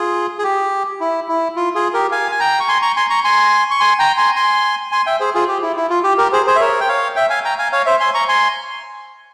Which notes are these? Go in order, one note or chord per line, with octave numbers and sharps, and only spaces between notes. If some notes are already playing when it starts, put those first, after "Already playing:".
Already playing: F4 G#4
G#4
G4
E4
E4
F4
F4 G#4
G4 A#4
F5 G#5
G#5
G5 A#5
C#6
G#5 C6
A#5 C#6
G#5 C6
A#5 C#6
G#5 C6
C#6
G#5 C6
G5 A#5
G#5 C6
G#5 C6
G#5 C6
E5 G5
G#4 C5
F4 G#4
G4
E4
E4
F4
G4
G4 A#4
G#4 C5
G#4 C5
E5
A#4 C#5
G5
C#5 F5
E5 G5
F5 G#5
G5 A#5
F5 G#5
C#5 F5
C5 E5
G#5 C6
A#5 C#6
G#5 C6